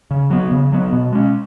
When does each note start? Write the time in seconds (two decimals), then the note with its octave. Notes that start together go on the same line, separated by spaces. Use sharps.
0.11 C#3
0.30 F#3 B3
0.51 C#3
0.72 F#3 B3
0.93 B2
1.13 G#3 C#4